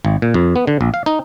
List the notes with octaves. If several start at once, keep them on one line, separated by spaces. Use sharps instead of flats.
G#1
A#2
F2
B3
D3
A#1
F5
D#4